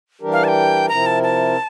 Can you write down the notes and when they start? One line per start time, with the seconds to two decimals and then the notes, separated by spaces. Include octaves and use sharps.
0.21 E3 G3 D4 G4 A#4
0.32 F5
0.44 A5
0.48 G5
0.89 C3 F3 C4 E4 A#4 A#5
1.06 A5
1.23 A5